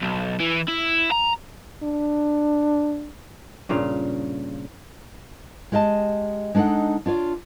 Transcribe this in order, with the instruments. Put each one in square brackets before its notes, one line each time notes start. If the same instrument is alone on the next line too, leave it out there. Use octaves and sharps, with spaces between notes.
[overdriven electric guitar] B1
E3
E4
A#5
[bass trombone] D4
[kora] G2 A#2 C#3 F5
[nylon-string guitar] G#3 G4 D#5 F5 A5
G#3 D4 D#4 A4 F#5
D4 F4 C#5 D5